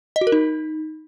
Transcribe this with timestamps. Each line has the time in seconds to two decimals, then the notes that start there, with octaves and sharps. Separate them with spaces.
0.16 D#5
0.21 F#4
0.27 A#4
0.32 D#4